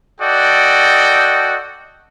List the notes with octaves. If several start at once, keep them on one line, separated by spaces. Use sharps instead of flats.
F#4 A4 D5 D#5 G5